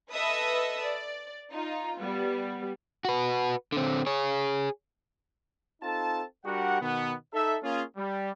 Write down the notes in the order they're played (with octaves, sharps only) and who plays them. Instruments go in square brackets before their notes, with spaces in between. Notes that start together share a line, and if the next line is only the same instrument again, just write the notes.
[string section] A4 B4 D#5 E5 D#6 E6
D5
D#4 F4
G3 B3
[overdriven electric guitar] F#4 B4
D3 C4
G#4 C#5
[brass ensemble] C4 D#4 F4 A4 A5
G3 D4 F#4 G4 A#4 F#5
B2 D#3 B3
D#4 A4 E5
A#3 C#4 F4 G#4
G3